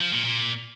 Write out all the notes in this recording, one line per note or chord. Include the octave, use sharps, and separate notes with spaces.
F3
A#2
A#2